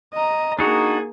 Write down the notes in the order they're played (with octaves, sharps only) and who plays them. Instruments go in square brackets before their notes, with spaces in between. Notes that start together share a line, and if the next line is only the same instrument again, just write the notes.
[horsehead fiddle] D#5 A#5
[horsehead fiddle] A#3 G#4 [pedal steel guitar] D4 D#4 F#4